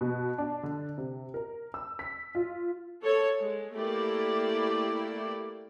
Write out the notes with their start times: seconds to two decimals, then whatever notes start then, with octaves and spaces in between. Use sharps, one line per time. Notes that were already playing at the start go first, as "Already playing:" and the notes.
0.01 B2
0.38 D4
0.63 D3
0.98 C3
1.34 A#4
1.74 E6
1.99 B6
2.35 F4
3.03 A4 C#5
3.40 G#3
3.74 A3 A#3 E4 G4 D5